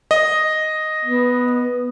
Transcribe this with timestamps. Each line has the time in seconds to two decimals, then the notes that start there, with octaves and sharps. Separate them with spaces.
0.11 D#5
1.05 B3